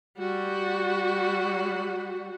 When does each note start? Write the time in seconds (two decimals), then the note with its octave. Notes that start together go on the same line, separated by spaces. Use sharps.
0.18 G3 F#4